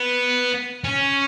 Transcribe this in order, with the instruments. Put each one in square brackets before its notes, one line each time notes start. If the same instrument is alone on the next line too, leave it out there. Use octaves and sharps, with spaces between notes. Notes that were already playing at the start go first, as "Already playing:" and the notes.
Already playing: [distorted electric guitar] B3
C#4